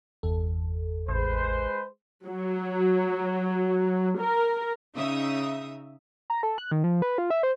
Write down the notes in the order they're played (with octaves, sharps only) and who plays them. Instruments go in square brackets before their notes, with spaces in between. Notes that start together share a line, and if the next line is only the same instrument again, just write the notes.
[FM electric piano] G1 E2 A4
[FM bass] A1 [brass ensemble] G#3 B4 C5
[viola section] F#3
A#4
[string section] C#3 D#4 E5 D#6
[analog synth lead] A#5
A4
F#6
D#3
F3
B4
F4
E5
C5